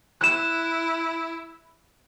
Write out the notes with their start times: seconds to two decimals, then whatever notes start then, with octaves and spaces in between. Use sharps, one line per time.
0.21 E4 F#6 E7